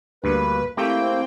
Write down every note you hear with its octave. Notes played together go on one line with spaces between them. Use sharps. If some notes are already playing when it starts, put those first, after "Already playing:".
D2 G2 A#3 B4
A3 A#3 C4 E4 G4 G5